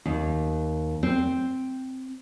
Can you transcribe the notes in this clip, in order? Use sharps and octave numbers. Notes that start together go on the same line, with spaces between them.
D#2
C4